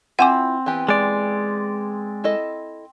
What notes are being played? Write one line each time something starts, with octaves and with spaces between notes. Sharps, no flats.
C4 E4 F4 E5 F#5 G#5 D6
E3 B3 G4
G#3 D5
E4 A4 D#5